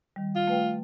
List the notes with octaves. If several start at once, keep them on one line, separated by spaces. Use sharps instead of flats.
D#3 G3
F4
A3 B4 G5